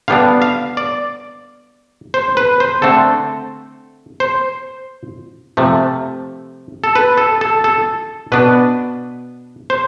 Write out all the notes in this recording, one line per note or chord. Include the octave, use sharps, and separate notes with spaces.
D3 G3 B3 D4 F5
F5
D5
C5
B4
C5
D3 A3 C4 A4
C5
C3 F3 A3
A4
B4
A4
A4
A4
B2 B3 D4 B4
C5